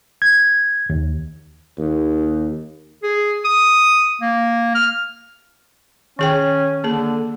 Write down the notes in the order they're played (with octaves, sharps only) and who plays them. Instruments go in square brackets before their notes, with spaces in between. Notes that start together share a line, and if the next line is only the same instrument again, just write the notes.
[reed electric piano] G#6
D#2
[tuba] D#2
[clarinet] G#4
D#6
A#3
F6
[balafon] D#3 G#4 G5 [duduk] C#4
[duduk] D3 [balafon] A#3 G#4